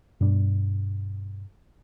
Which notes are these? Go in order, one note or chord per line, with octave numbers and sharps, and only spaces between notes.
G2 B2 D4